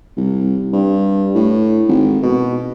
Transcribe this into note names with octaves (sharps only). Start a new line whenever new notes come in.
C2
G2
A2
G#1
B2